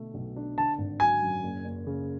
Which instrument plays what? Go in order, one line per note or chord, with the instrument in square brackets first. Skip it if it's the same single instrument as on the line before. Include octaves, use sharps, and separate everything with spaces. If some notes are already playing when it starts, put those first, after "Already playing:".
Already playing: [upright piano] B2 D3 A3
B1
D4
[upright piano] D3 [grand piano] A5
[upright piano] G#1
[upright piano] F#3 [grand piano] G#5
[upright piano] F#2
F#1
F#1
C#3